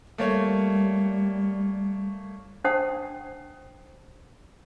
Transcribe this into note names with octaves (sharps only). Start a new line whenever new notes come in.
G3 A3 A#3 C#5
D4 C5 F#5 G5 A5 D#6